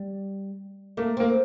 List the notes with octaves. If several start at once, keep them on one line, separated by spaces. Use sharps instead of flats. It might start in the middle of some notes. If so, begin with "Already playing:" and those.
Already playing: G3
A3 A#3
A#3 C4